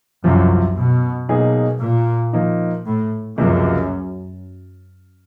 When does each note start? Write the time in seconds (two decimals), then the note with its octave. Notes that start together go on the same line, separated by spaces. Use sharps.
0.24 C2 F#2 C3 F3
0.76 B2
1.29 B2 F#3 A#3 D#4 G#4
1.81 A#2
2.33 F3 A#3 D#4
2.86 A2
3.37 C#2 F#2 C3 F3 A#3